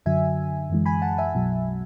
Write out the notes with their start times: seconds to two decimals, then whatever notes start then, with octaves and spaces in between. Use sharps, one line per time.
0.06 F#2 D3 F#3 E5 G#5
0.70 F#2 E3 G#3
0.86 G#5 B5
1.02 F#5 A5
1.18 E5 G#5
1.34 B1 B2 F#3